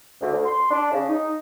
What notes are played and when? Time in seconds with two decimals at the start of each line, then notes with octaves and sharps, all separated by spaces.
0.21 D2
0.33 D2
0.46 C6
0.71 D4
0.92 C#3
1.08 D#4